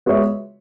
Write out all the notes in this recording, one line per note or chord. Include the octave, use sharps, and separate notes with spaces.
G#3 B3 F#4 C#5 E5